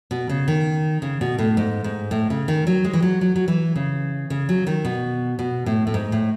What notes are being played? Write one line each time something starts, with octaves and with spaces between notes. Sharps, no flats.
B2
C#3
D#3
C#3
B2
A2
G#2
G#2
A2
C#3
D#3
F#3
G#3
E3
F#3
F#3
F#3
E3
C#3
C#3
F#3
D#3
B2
B2
A2
A2
G#2
A2